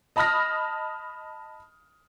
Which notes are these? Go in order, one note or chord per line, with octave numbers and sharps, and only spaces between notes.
D#5 A5 B5 D#6 F6 A#6